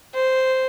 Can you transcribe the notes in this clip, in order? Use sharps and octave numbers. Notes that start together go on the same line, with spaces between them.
C5